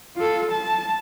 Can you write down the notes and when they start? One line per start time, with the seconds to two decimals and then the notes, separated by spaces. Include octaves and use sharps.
0.16 F4 A4
0.51 A5